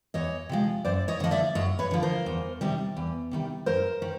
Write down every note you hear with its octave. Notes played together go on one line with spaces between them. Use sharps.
E2 C#5 D#5
C3 F3 G#3
F#2 C5 D5
C#5 D#5
D3 F3 D#5
D5 E5
F#2 C#5 D#5
B4 C#5
D3 F3
A#4 C5
E2
C3 D#3 G3
E2
C3 D#3 G3
F#2 A#4 C5
D#3